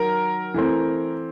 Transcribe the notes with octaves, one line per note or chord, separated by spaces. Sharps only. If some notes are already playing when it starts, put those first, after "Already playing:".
Already playing: D#3 F#3 A#4
E3 A3 C4